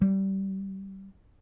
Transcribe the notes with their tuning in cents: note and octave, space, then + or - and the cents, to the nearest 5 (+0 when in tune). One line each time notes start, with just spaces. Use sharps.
G3 -20